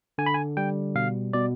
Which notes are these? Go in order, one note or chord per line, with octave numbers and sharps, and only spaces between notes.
D3 G#5
B5
G#5
G3 G5
B2 F5
B2 D5